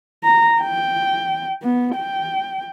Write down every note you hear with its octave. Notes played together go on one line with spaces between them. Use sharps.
A#5
G5
B3
G5